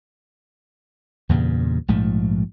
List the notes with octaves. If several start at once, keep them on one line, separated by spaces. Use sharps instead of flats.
E2 G2 A#2 C#3
A#1 G#2 F3 A3